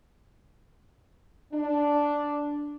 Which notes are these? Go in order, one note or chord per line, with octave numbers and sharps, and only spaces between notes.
D4